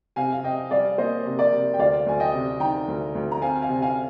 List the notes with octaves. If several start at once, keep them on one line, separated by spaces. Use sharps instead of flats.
C3 F5 G#5
F5
C3 D#5 G5
G3 D5 F5
A#3 C5 D#5
C3
A#4 D5
C3
G5
D2 D5 F5
D2 G#5
D#5 G5
C3
D#3 G5 A#5
D2
D2
A#5
C4 F5 G#5
F5 G#5
C3
F5 G#5